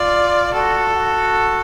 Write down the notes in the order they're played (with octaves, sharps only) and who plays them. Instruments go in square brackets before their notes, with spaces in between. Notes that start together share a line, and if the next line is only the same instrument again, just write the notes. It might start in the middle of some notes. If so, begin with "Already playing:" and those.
Already playing: [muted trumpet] F4 [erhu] D5
[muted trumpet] F#4 [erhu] A4
[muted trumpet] F#4